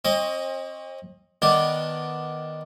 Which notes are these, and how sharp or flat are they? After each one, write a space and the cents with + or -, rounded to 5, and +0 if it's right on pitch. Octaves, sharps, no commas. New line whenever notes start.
C4 +40 D#5 +0 C#6 +45
D#3 +0 B3 +0 D4 +0